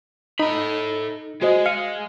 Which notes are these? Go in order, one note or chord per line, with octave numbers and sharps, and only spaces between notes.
D#4 A4 B5
G#3 F#4 C5 D#5
F5 C#7 D#7